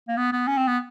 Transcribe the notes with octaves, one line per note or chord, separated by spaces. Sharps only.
A#3
B3
B3
C#4
C4
B3